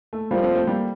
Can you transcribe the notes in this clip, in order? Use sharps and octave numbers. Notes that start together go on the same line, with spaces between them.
A3
F3 G3 A#3
A3 C4
A3 C4
G3 A#3